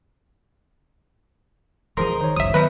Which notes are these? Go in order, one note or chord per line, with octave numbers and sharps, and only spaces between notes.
E1 E2 F3 G#4 A#4 C5 D#5 C6
D#3 C5 C#5
G1 C#2 F#2 E5 D#6
D#3 F#3 B3 C#4 D#4 E4 B4